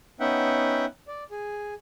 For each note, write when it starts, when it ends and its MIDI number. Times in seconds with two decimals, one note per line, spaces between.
0.20 0.86 59
0.20 0.86 61
0.20 0.86 63
0.20 0.86 76
0.20 0.86 78
0.20 0.86 79
1.08 1.24 74
1.31 1.74 68